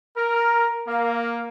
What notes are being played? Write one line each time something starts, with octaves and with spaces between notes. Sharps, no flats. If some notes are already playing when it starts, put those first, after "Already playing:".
A#4
A#3